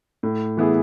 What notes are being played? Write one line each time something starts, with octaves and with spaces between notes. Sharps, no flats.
A2
E3 B3 E4 G#4